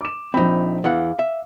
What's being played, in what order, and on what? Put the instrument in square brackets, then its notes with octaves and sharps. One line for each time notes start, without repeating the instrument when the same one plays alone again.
[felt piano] D6 E7
[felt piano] A#1 F3 B5 [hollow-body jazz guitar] C4 D#4
[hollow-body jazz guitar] E2 E3 F#5 [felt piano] F5
[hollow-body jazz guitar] E5